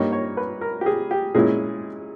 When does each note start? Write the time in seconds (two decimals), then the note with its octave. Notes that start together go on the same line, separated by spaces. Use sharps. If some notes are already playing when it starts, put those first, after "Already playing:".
Already playing: G2 G3 A#3 D#4 C#5
0.12 C#5
0.37 B4
0.61 A#4
0.81 G4
0.86 G#4
1.11 G4
1.35 A#2 G#3 C#4 E4 G#4